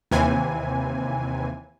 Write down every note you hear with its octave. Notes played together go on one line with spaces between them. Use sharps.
D#2 C3 E3 G#5